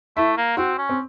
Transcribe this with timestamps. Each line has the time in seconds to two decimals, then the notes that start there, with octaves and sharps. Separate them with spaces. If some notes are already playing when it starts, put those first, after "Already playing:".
0.17 A3 E4
0.37 A#3
0.57 C4 F#4
0.78 C#4
0.89 C4